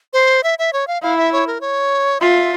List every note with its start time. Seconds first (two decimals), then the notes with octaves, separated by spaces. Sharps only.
0.13 C5
0.43 E5
0.59 E5
0.73 C#5
0.87 F5
1.02 E4 F5
1.17 E5
1.32 C#5
1.47 A#4
1.61 C#5
2.21 F4 E5